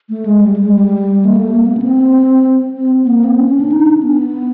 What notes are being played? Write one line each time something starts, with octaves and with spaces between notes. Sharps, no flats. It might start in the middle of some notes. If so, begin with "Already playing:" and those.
A3
G#3
G3
G#3
G3
A#3
A3
A#3
B3
C#4
C4
C4
B3
A#3
C4
C#4
C#4
D4
D#4
D4
B3